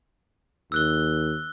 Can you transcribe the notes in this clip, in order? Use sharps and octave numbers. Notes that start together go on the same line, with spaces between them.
D#2 E6 F#6 G7